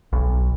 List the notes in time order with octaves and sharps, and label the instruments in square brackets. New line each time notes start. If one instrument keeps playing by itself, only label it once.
[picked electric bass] B1